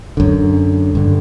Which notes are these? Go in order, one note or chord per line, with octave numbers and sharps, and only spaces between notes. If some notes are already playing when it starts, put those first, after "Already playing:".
F#2 D3
G2 D3